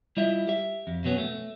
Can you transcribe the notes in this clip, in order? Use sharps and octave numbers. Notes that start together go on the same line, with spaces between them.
G3 E4 F4 D#5 E5
G4 E5
F2
B2 F#3 B3 C#4
A3